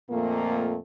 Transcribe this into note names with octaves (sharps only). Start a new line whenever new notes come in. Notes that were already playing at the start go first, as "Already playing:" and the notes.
F2 A#2 A3 A#3